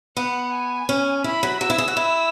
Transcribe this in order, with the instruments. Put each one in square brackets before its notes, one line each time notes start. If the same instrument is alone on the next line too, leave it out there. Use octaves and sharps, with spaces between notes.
[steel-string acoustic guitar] B3 [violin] F#5
[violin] G#5
[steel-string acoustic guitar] C#4
[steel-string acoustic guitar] E4 [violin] B5
[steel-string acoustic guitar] F#3
[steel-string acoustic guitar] F#3 [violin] E6
[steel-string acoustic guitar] E4
G#4
F#4
E4